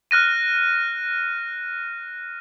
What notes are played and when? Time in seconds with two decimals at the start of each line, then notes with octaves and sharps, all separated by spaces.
0.11 F6 F#6 A#6 D#7